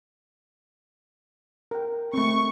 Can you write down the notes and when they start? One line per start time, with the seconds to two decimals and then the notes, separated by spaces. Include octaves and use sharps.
1.71 A#4 G5
2.14 A3 C4 C#6